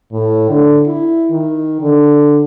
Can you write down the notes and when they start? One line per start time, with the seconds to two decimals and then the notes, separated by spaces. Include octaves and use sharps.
0.12 A2
0.50 D3
0.86 E4
1.31 D#3
1.81 D3